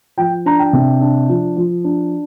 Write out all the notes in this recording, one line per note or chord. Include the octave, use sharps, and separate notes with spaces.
F3 G5
D4 A#5
G5
C3
D4
F3
F3
D4